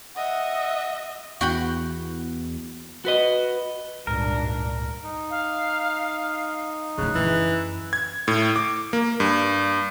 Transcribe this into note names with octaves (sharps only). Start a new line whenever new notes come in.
D#5 E5 F#5
E2 F#4 G5 B5
F#4 B4 D#5
G#1 C#2 G2 A#2 D4 A#4
D#4
F5
G#2 C#3 A3 F#6
F#2 E3
G#6
A2
D6
A#3
G2